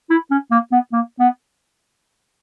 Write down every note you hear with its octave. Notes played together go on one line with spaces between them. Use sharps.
E4
C#4
A#3
B3
A#3
B3